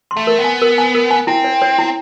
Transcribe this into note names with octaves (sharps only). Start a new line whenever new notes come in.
C6
A3
A#4
B3
G#5
A#4
G#5
A#4
G#5
C4 E4
C#5
C#5
E4